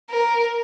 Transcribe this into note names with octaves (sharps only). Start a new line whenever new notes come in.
A#4